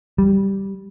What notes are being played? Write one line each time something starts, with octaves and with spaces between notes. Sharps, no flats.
G3